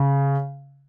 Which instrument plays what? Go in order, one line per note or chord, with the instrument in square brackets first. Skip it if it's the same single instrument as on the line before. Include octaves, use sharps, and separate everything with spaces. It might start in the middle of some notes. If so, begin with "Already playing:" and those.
Already playing: [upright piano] C#3